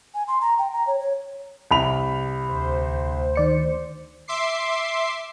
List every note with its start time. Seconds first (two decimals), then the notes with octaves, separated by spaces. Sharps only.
0.14 G#5
0.28 C6
0.41 A#5
0.59 G5
0.73 A#5
0.87 C#5
1.00 C#5
1.71 C2 B5 F7
2.49 D2 C5
3.36 D#3 D5 C#7
4.28 E5 C6 D6 C7